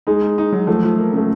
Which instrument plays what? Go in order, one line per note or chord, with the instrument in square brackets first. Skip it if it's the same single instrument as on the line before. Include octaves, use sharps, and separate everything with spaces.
[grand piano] G#3 [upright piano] D#4
[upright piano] D#4
D#4
F#3
[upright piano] F3 [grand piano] A3
[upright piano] F3
A#3
[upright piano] C#3 [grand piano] A3